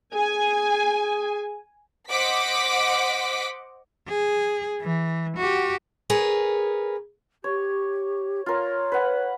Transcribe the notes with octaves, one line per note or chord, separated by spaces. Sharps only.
G#4 G#5
C5 D#5 F#5 D6 B6
G#4
E3
F#4 G4
G#4 A#4 B4 C#5
G4 C#5
F4 A#4 C#5
B4 F#5